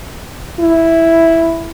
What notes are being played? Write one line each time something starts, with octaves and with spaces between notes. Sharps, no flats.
E4